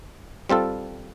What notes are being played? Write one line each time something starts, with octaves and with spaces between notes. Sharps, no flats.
G3 C4 F4 A4